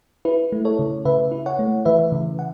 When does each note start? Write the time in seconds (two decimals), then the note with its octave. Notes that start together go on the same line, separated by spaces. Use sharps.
0.25 E4 B4
0.52 A3
0.65 A4 C#5
0.79 C#3
1.05 C#3 B4 E5
1.32 E4
1.46 C#5 F#5
1.59 A3
1.85 E3 B4 E5
2.12 C#3
2.39 F#5